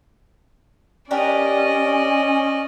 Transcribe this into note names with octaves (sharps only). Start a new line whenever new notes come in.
C#4 D4 G4 A#4 D5 D#5